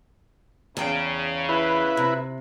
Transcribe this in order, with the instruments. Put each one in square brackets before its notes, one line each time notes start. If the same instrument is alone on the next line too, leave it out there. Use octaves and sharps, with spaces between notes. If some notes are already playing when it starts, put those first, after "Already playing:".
[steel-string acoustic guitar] E2 G5 [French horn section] C#3
[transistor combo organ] E4 B4
[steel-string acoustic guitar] C3